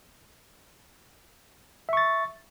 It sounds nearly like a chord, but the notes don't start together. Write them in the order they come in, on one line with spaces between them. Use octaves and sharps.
E5 C#6 A6